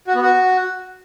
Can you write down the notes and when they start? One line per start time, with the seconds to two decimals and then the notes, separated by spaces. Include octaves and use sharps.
0.07 F#4
0.15 B3
0.22 F#4